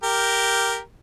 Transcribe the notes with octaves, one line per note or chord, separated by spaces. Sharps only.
G4 A#4